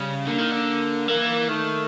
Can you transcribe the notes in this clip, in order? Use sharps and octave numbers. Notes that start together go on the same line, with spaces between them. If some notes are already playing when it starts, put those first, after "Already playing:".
Already playing: C#3 G3
D3 A#3
D#3
D3
E3 A#3
D#3 A3